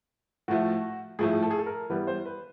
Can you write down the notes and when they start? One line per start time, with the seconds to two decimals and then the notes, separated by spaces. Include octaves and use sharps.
0.48 A2 F3 A3 F#4
1.19 A2 F3 A3 G#4
1.43 A4
1.51 G#4
1.59 A4
1.66 A#4
1.90 E3 G3 B3 B4
2.07 C5
2.26 B4